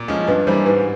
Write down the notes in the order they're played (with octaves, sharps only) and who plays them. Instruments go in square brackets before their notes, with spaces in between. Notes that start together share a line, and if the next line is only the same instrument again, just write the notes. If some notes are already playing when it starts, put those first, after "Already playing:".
Already playing: [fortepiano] A#2
F3 G#3 C#4
[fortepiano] G2 [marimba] B4
[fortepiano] E3 G3 A#3 [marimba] C5
[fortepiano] G#2 [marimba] B4